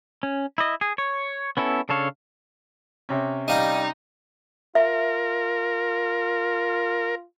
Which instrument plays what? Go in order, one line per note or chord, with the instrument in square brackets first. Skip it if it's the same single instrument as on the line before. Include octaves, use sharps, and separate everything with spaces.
[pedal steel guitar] C#4
E4 D#5
G#4
C#5
B3 C#4 E4 A4
C#3 D4 A4 C#5 F5
[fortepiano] C3 C#4
[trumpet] G3 [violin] D#4 [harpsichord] D#5 F5 A#5
[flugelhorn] F4 [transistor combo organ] A#4 [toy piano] E5